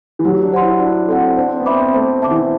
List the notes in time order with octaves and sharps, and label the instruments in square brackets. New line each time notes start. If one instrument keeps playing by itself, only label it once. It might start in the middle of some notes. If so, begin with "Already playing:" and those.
[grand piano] E3
[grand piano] F#3 [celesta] G4
[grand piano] D4
[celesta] C5 F#5 C6
[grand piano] E4
[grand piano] D4 [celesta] F#4
[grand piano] C4 [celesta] A4 D5 F#5
[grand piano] D4 [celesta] C5
[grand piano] C4
B3
[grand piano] C4 [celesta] E5 B5 D6
[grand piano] A3 [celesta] C5
[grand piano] D3 [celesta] E5 A5 D6
[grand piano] E3